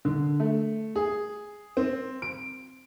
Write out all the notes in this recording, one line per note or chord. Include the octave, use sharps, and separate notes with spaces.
D3
A3
G#4
C4
D7